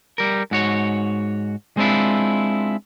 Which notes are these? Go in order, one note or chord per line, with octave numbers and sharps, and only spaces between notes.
G3 A#4
G#2 F#4 C#5
G#3 C4 D4 E4 F4